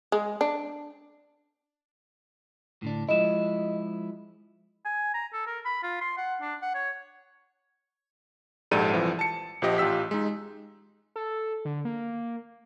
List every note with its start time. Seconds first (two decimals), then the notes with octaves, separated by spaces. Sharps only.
0.12 G#3
0.41 D4
2.82 A2 D3 D4
3.09 F3 G#3 E4 D#5 E7
4.85 G#5
5.14 A#5
5.33 A4
5.47 A#4
5.65 B5
5.83 F4
6.01 C6
6.17 F#5
6.41 D4
6.62 F#5
6.74 C#5
8.71 A#1 G#2 G4 A4 D5 D#7
8.94 C2 E3 F3
9.19 A5 C#7
9.62 A#1 F3 G4 D#5
9.78 A1 F4 G4 E6 B6
10.11 G#3 D#4
11.16 A4
11.65 D3
11.85 A#3